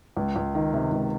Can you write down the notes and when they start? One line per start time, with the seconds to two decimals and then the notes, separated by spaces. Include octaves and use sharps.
0.17 C#2
0.36 C#2
0.55 D#3
0.74 C3
0.92 C#2